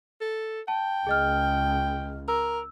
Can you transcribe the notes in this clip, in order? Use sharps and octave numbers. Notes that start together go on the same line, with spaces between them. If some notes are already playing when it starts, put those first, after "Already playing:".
A4
G5 A5
C#2 G#4 D#5 F6
A#4 E6